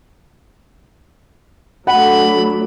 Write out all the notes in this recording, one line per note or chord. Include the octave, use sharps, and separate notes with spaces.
F#3 A3 D4 F#5 B5